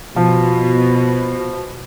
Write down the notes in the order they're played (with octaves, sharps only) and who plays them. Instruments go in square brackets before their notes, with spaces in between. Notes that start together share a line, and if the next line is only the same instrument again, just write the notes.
[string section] B2 [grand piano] F3